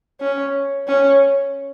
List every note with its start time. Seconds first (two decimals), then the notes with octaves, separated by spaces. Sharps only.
0.21 C#4
0.88 C#4